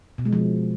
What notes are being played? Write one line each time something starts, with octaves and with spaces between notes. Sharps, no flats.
B2
G#3
F3